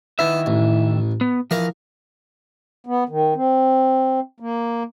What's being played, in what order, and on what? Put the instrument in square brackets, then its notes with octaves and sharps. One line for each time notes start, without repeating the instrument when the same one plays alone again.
[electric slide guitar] D#3 E4 E5 [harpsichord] B3
[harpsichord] A1
[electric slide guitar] B3
[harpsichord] E3 F5 [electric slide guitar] F3 A#4
[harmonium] B3
D#3
C4
A#3